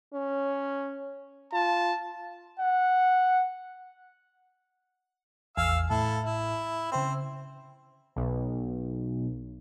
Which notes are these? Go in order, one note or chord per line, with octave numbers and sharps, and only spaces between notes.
C#4
F4 A5
F#5
A1 E2 F5 G#5 E6
A2 E4 A4
E4
C#3 C4 C5 E6
B1